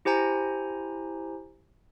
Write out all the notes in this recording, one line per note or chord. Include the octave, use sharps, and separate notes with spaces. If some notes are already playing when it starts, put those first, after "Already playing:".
E4 G4 C5 G#5 A#5